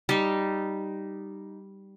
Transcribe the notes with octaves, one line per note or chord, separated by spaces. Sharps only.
G3 D#4